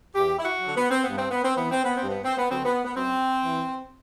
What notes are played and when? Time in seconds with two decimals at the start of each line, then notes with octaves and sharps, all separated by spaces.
0.14 E2 G4
0.39 E4
0.45 F#4
0.61 F#3
0.66 D3
0.76 B3
0.90 C4
1.04 G2 B3
1.18 C4
1.31 B3
1.44 C4
1.56 E3 B3
1.71 C4
1.84 B3
1.97 C4
2.02 G2
2.10 B3
2.24 C4
2.37 B3
2.49 D3 F#3 C4
2.64 B3
2.85 B3
2.96 F#2 C4
3.43 E3